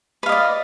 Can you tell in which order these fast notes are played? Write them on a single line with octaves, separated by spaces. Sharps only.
B4 F5 D#5 D5